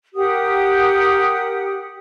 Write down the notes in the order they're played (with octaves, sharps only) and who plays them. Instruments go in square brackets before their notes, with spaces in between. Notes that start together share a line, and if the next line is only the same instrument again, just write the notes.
[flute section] G4 A#4 F#5 D#6